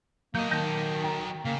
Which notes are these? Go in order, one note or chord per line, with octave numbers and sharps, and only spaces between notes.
F#3 A#3 D#5 G6
D#3 A5 G6 A#6
G5 A#5
C#3 A#3